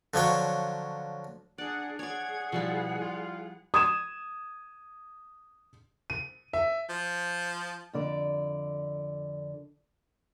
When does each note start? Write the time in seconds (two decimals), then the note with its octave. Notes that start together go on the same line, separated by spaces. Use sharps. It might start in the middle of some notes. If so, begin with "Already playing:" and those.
0.14 D3 F3 F#3 C#5
1.58 D4 G#4 D5 F#5
1.99 G#4 C#5 D5 F#5 G#6
2.52 B2 F3 G3 E4
3.01 F4
3.74 D#6 G#6 E7
6.10 D#7
6.53 E5
6.89 F3
7.93 F2 D3 D5